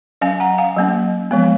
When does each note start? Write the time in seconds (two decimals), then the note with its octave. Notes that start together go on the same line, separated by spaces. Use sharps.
0.21 F#3 C#4 F5 G#5
0.40 F#5 A#5
0.58 F5 G#5
0.77 F#3 A#3 C#4
1.31 F3 G#3 B3